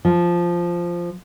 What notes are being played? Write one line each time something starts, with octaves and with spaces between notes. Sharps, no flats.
F3